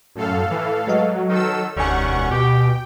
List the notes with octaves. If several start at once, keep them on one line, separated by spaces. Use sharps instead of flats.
F#2 A2 A4 F5
E3
F#3 G#3 B4 D#5
D#3 A4 E6
E1 D2 D#3 G3 C#4 F#5 G#5 C#6
B2 G4 G5